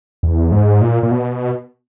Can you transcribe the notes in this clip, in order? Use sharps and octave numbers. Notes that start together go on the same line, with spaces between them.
E2
G#2
A#2
A#2
B2